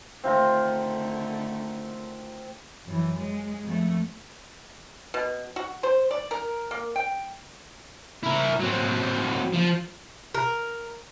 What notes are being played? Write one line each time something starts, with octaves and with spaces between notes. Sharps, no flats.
D3 D#3 A3 C4 F4 A#4
F#2 E3
G#3
F2 A3
B2
F#4
C5
D5
A#4
A#3
G5
E4 A#4
F#3 C4
F3
A#4